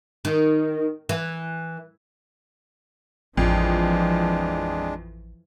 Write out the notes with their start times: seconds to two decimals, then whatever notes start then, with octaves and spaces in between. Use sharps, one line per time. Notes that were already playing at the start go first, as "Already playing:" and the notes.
0.25 D#3
1.09 E3
3.37 A1 F2 E3 F3 G#3 D4